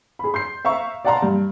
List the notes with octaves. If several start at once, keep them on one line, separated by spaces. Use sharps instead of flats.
G#4 B5
C6 G6 C7
E5 F5 A#5 C#6 E6
D5 F5 F#5 A5 A#5 C6
G2